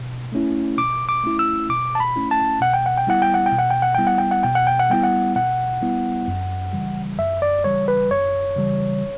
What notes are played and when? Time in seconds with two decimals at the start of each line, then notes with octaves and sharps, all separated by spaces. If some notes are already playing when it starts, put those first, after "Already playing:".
Already playing: B2
0.32 A3 C#4 E4
0.78 B2 D6
1.09 D6
1.23 A3 C#4 E4
1.39 E6
1.69 B2 D6
1.95 A5
2.00 B5
2.16 A3 C#4 E4
2.31 A5
2.61 B2 F#5
2.74 G5
2.86 F#5
2.98 G5
3.07 G3 B3 E4 F#5
3.22 G5
3.34 F#5
3.46 G5
3.52 B2
3.58 F#5
3.70 G5
3.82 F#5
3.95 G3 B3 E4 G5
4.07 F#5
4.18 G5
4.31 F#5
4.43 B2 G5
4.55 F#5
4.67 G5
4.79 F#5
4.90 G3 B3 E4 G5
5.04 F#5
5.36 B2 F#5
5.82 G3 B3 E4
6.28 F#2
6.73 C#3 E3 G3
7.19 F#2 E5
7.42 D5
7.64 C#3 E3 G3 C#5
7.88 B4
8.11 F#2 C#5
8.56 C#3 E3 G3